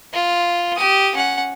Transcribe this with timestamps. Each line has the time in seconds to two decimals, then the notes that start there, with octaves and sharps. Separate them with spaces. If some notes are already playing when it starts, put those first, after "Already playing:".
0.13 F4
0.76 G4 D#6
1.15 C#4 F#5